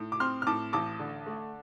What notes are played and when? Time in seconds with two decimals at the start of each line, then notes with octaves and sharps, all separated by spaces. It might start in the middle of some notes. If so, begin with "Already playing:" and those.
Already playing: A2
0.12 D6
0.20 C4 C6 F6
0.42 F6
0.47 A2 A5 D6
0.73 A1 A5 D6
0.99 D3
1.26 A3